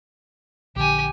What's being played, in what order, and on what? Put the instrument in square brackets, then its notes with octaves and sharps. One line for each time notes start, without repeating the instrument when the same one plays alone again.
[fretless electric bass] A#1 D3 [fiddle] G4 G#5